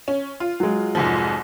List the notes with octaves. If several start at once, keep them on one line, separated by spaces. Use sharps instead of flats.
C#4
F4
F#3 G#3
F1 G#2 F3